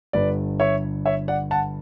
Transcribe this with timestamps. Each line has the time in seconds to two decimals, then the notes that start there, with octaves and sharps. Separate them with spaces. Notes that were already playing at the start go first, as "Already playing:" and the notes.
0.13 G1 G2 D3 B4 D5
0.60 C#5 E5
1.06 C#5 E5
1.28 D5 F#5
1.51 F#5 A5